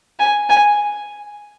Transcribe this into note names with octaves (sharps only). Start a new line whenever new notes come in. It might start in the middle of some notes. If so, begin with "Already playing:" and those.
G#5
G#5